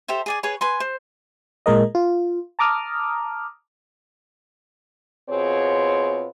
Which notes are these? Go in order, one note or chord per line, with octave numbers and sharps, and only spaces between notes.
G4 A4 C5 E5
G#4 D5 G#5
G#4 B4 C#5 G#5
B4 G#5 C6
C5
A#2 G#3 A#4 D#5
F4
A5 A#5 D6 D#6 F6
B2 C4 F4 G#4 B4 C#5